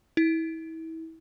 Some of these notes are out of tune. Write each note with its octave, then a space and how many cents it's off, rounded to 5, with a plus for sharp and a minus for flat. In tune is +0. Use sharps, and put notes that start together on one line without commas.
E4 -30